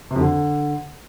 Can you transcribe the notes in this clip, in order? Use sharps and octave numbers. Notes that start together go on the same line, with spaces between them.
C3
F2
D3